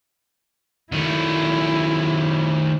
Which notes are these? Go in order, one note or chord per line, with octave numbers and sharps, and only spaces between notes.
D#3 A3 E4